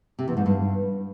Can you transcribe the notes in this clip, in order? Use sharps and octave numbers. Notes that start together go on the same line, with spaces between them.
C3
E2
G#2
G2